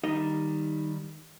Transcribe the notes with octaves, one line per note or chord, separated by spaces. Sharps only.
D#3 G3 D#4 D#5